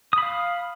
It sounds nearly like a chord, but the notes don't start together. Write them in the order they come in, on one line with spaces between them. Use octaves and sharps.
D#6 B5 F5